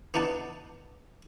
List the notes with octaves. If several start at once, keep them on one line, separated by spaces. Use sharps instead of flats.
B3 D4 D#4 F#5 A5